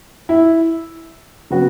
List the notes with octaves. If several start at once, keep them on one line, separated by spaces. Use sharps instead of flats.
E4
C#3 F#3 B3 F#4